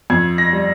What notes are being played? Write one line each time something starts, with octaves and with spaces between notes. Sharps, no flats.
F2 G#6
A#6
G3